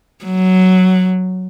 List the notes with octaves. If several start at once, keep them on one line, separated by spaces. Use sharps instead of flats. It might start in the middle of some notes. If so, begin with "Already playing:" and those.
F#3